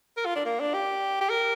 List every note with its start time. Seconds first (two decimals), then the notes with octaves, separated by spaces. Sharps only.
0.17 A#4
0.26 F4
0.36 D4
0.45 A#3
0.60 D4
0.74 G4
1.21 G4
1.30 A#4